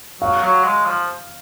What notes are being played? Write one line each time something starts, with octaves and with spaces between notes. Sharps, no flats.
F#3 F5
F#3
G#3
F3